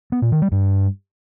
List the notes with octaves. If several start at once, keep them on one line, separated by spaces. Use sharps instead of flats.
B3
A#2
D#3
G3
G2